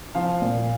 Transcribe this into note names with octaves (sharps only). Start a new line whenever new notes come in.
F3 F5
A#2